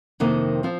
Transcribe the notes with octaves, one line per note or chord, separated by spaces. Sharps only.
F2 C3 D#3 A#3
F3 C4